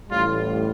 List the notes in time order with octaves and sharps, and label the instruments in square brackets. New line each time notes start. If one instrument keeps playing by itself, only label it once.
[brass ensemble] A1 A2 G3 F4